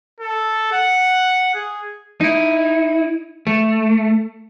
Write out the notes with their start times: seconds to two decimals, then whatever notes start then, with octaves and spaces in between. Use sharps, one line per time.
0.20 A4
0.72 F#5
1.54 G#4
2.21 D#4 E4
3.47 A3